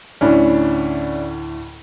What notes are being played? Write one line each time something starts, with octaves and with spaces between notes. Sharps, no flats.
D2 A2 D3 C#4 D4 E4